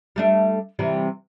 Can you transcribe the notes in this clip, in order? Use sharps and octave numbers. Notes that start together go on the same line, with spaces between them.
G3 A3 D4
C3 E3 G3